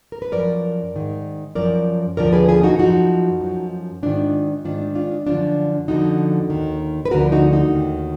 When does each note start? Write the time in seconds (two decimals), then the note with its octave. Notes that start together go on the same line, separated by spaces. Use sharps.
0.12 A#4
0.22 B4
0.32 F#2 F3 A#4 D5
0.94 G#2 D#3
1.55 F#2 F3 A#4 D5
2.17 D#2 D3 F3 A#4 D5
2.33 G#4 B4
2.48 F4 G#4
2.63 D#4 F#4
2.79 F#2 F3 D#4 F#4
3.41 F#2 F3
4.03 G#2 D#3 D4 F4
4.64 G#2 D#3 D4 F4
4.95 D4 F4
5.27 F#2 D3 F3 D4 F4
5.88 F2 D3 F3 D#4 F#4
6.50 D#2 D#3
7.05 B4
7.11 D2 D3 F3 F#4 A#4
7.32 D#4 F#4
7.53 D#4 F#4
7.74 D#2 D#3